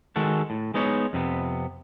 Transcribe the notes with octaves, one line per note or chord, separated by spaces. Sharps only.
D#3 G#3 F#4 A4
A2
G#3 B3 D#4 C#5
F2 C3 B3